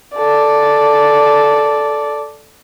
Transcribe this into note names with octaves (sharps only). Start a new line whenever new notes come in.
A4 D5